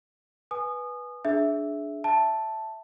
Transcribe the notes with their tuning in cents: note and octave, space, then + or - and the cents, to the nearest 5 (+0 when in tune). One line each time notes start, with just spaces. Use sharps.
B4 -10 G#5 +15 D#6 -25
D4 +0 G#4 +20 E5 +0
E5 +0 A5 +0